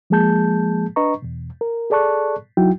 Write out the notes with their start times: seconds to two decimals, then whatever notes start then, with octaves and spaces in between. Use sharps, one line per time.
0.10 F3 G#3 A#3 G#4 A5 G6
0.96 D4 B4 D#5 A#5 C#6
1.22 E2 B2
1.61 A#4
1.90 G#4 A4 D5 A5 C#6 F#6
2.57 C2 F#3 D#4 E4 F#4 G5